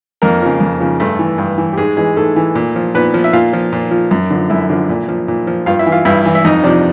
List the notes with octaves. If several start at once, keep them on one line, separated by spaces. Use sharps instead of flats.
F2 A#3 A#4
C#3 F3
F2
C#3 F3
G2 A3 A4
E3
G2
E3
G4
G#2 G#3 G#4
E3 G#3 G#4
G#2 A3 A4
E3
A#2
F3
A#2 B3 B4
F3
E5
A#2 F4 F5
F3
A#2
F3
F#2
D3 F3
F#2 E4 E5
D3 F3
A#2
F3
A#2
F3
G2 F4 F5
E4 E5
E3
F4 F5
G2 E4 E5
E3
E5
F2 D#4 D#5
C3 F3 D4 D5